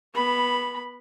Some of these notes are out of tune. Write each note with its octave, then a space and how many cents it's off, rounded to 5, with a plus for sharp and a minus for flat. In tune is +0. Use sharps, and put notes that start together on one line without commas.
B3 -15 B5 +0